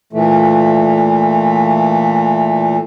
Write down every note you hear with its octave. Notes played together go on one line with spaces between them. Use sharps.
A#2 E3 A3